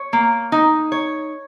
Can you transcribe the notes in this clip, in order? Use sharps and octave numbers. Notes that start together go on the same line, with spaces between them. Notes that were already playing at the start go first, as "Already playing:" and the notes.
Already playing: C#5
A#3
D#4
C#5